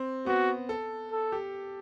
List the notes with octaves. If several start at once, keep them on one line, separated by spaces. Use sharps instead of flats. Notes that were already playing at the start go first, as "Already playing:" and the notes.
Already playing: C4
B3 F#4
A4
A4
G4